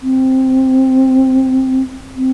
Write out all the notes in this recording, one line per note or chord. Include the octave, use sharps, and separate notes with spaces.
C4
C4